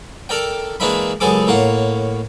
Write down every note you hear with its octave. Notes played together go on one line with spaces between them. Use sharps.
A4 A#4 D5 G5
E3 G#3 A#3 D4 E5 B5
C#2 F#2 B3 G#4 A4 D6
A2 A#3 C#5 F#5